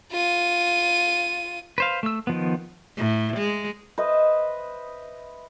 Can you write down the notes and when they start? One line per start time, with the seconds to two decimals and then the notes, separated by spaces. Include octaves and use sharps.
0.12 F4 D#7
1.78 B4 C5 F5
2.03 A3 E6
2.27 D#3 F3 B3
2.97 A2
3.37 G#3
3.98 B4 C5 D#5 E5